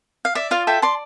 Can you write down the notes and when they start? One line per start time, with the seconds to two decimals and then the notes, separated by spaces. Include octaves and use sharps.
0.25 F5
0.35 D5 E5
0.51 F4 F5
0.67 A4 E5 G5
0.82 D5 A5 C6